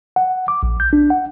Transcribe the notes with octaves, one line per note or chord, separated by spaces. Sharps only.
F#5
D6
A#1
G6
D4
F#5